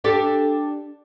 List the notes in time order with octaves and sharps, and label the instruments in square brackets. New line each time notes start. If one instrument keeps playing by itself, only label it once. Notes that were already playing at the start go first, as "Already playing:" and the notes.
[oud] D4 G4 A4